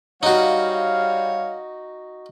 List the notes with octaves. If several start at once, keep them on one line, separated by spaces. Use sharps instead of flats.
G3 D#4 F#4 C#5 F5